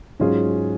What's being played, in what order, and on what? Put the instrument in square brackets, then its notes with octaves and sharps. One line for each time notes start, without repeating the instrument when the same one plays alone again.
[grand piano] G#2 F#3 C#4 F4 G#4